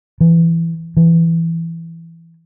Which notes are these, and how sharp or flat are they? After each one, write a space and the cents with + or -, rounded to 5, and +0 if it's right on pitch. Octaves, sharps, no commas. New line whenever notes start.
E3 +15
E3 +10